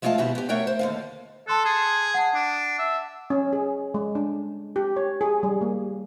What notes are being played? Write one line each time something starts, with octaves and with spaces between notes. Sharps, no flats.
F3 G#3 A3 F4 F5 A5
D#2 B2 E4 F#4 G4 A#5
B3 G4
A3 A#4 C#5 F#5 G5
C5
D#2 D3 F5
A4 A5 C6 F#6
G#4
F#5 A5
D4
E5
C#4
G#4
G#3
D4
G4
C#5
G#4
G3
A#3